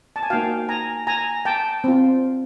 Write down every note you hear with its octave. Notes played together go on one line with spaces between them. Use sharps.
A5
G#5
A#3 D#4 F#4 F5 G5
G#5 A#5
G#5 A#5
G5 A5
C4 F4